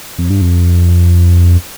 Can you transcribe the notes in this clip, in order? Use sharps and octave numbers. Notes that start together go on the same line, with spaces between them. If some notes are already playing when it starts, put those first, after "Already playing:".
F2
G2
F2